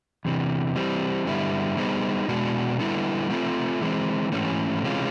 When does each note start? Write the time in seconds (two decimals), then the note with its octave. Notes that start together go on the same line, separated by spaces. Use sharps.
0.25 E2 C3 E3
0.76 E3 G3 C4
1.26 G2 D3 G3 B3 E4
1.77 G3 B3 D#4 G#4 C5
2.28 B2 G#3 B3 D4 F#4
2.79 D3 G3 B3 E4 A4
3.30 A3 C4 F4
3.81 E3 G#3 C4
4.32 G#2 E3 A3 C#4
4.83 C3 E3 G#3 C#4 F4